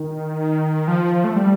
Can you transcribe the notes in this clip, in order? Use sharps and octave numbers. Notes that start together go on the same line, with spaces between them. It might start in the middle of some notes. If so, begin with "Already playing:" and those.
Already playing: D#3
F3
A3
G3